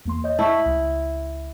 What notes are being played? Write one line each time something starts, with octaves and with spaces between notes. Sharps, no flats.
E2 A#3 C6
C#5 D#5 G6
E4 A5 C#6 B6
C#2